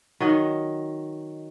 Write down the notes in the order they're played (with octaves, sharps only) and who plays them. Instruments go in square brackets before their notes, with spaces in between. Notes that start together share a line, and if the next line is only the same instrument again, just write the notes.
[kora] D#3 F#3 D#5